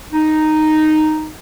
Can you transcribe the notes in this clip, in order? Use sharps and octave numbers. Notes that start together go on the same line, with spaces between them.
D#4